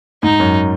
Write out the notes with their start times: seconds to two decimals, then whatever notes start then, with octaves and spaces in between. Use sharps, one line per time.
0.23 G#2 D#4
0.40 F#2